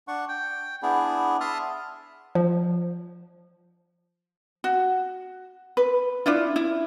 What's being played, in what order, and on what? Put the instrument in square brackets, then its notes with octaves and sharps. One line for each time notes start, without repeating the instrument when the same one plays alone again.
[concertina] D4 F#5 C#6
G5
B3 D4 E4 G#4
E5 A5 C6 D#6 F6
[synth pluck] F3
[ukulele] F#4
B4
C#4 D4 E4 F4
E4